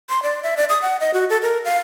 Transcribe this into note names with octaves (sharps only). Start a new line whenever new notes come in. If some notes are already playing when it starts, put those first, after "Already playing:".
C6
D5
E5
D5
D#6
F#5
D#5
F#4
A4
A#4
F5